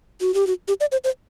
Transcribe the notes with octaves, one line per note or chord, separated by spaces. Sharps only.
F#4
G4
F#4
G4
D5
C5
C5